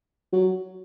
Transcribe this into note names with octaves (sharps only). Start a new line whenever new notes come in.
F#3